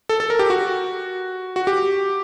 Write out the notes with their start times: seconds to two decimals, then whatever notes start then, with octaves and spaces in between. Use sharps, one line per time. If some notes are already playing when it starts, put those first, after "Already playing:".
0.09 A4
0.20 A4
0.30 A#4
0.39 G4
0.50 F#4
1.56 F#4
1.67 G4